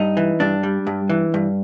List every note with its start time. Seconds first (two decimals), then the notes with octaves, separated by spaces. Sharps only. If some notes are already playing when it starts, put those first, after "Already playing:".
Already playing: G2 D#4
0.17 E3
0.40 G2 D4
0.63 G3
0.87 G2
1.09 E3
1.34 G2